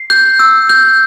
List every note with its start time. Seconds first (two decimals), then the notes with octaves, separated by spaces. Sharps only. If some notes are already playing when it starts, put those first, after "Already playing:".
Already playing: C7
0.10 G6
0.39 E6
0.69 G6